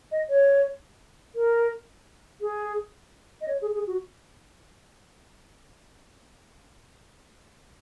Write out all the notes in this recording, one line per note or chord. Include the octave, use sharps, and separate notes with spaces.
D#5
C#5
A#4
G#4
D#5
C#5
G#4
G#4
F#4